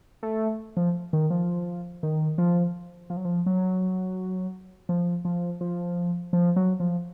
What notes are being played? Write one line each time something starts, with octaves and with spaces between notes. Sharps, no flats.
A3
F3
D#3
F3
D#3
F3
F3
F#3
F3
F#3
F3
F3
F3
F3
F#3
F3